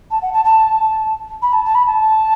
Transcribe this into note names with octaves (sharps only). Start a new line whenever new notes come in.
A5
F#5
A5
A5
B5
A5
A5
B5
A5